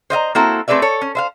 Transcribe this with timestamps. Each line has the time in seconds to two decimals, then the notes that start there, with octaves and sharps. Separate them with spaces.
0.10 C5 D#5 E5 A#5
0.35 A#3 C4 E4 F#4 A4 C5
0.68 A3 C4 G#4 B4 D5 E5
0.82 A4 C#5
1.01 C#4
1.15 C5 E5 F5